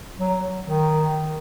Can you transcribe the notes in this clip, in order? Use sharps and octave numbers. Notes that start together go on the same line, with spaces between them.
F#3
D#3